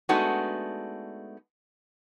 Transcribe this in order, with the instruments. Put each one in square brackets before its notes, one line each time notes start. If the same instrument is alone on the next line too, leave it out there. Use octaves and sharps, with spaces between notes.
[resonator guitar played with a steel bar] G#3 A3 B3 D4 D#4 F#4